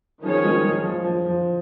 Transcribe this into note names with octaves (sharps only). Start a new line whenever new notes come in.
D#3 F3 C#4 G#4 C#5
G#3
G#3
F3
F3
F3